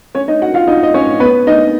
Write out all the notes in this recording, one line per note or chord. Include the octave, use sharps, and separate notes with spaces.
C#4 C#5
D#4 D#5
F#4 F#5
F4 F5
D#4 D#5
D#5
C#4 C#5
B3 B4
D#4 D#5